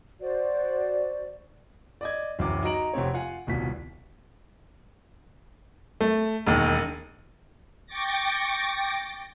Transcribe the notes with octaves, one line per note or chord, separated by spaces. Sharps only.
F#4 C5 D5
D5 D#5 G#6
D1 F#2 E3 D6
D#4 F#4 A#5 D7 F#7
F1 C3 C4 C#5
F4 F5 F#5 G#5
D#1 C2 B2 B6
A3
E1 D#2
G5 C#6 D6 A6 A#6